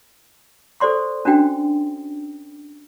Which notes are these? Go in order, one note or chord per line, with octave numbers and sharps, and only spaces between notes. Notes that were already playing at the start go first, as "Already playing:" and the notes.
A4 C5 D5 C6 C#6
C#4 D4 F#4 G5